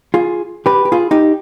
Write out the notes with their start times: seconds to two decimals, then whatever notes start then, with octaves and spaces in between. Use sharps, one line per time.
0.14 F4 G#4
0.66 G4 B4
0.85 G4
0.92 F4 G#4
1.11 D#4 G4